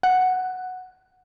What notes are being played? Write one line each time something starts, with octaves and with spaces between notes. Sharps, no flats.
F#5